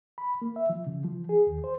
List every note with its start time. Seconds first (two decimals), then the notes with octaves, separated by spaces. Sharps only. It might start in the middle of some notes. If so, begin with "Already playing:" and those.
0.18 B5
0.42 A#3
0.56 E5
0.70 F3
0.87 C#3
1.05 F3
1.29 G#4
1.47 D#2
1.64 C5